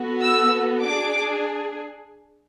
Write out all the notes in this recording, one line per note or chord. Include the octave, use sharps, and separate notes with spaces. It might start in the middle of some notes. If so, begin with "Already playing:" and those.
Already playing: B3 F#4 A4
E6
D4 G#4 D6